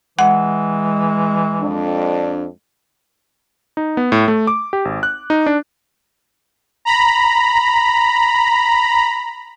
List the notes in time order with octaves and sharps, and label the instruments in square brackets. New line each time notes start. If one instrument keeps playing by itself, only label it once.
[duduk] E3 [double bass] G#3 [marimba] F#5
[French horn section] F2 D4
[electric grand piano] D#4
B3
A2
A3
D6
G4
G#1
F#6
D#4
D4
[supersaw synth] A#5 B5